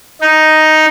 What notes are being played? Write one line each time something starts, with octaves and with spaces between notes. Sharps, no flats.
D#4